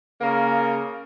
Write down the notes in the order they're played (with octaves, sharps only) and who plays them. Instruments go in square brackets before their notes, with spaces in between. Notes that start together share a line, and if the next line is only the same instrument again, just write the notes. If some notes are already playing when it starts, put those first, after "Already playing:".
[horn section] C#3 A#3